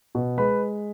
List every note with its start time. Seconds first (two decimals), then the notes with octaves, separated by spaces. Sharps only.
0.15 B2
0.38 G#3 B4 B5